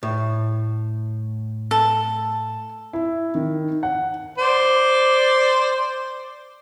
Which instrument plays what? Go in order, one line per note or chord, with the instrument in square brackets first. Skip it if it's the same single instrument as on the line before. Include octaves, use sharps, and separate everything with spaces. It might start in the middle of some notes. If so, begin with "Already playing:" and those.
[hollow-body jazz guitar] A2
[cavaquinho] A4
[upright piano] E4
D#3
F#5
[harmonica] C5 D5